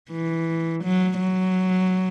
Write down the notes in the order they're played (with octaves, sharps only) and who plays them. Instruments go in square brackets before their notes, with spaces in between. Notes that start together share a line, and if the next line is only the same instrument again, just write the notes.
[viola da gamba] E3
F#3
F#3